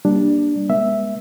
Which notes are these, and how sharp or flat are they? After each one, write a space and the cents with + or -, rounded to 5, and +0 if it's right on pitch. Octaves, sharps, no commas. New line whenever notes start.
G3 +0 A#3 +15 D4 +0
G#3 -10 B3 -40 E5 +0